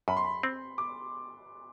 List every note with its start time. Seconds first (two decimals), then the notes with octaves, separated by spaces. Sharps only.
0.08 F#2 B5
0.17 C6
0.25 B5
0.43 C4
0.78 D6